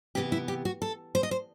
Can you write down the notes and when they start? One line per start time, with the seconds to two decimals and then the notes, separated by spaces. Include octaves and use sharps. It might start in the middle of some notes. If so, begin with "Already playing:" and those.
0.15 C3 E3 B3 G4
0.32 E4
0.48 G4
0.65 F#4
0.82 A4
1.15 C5
1.23 D#5
1.31 C5